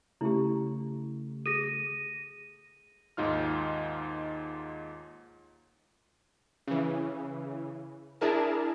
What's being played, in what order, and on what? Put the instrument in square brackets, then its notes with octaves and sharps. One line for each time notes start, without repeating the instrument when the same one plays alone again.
[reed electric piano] C#3 A3 [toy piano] E4 G4
[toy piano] G#4 A4 [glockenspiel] A#6 D#7
[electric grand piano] D#2 G#2 D#4 F4 F6
[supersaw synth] C#3 E3
D4 E4 G#4 A#4 A5